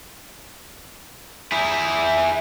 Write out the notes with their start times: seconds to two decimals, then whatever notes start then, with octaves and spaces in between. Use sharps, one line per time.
1.52 E4 G#4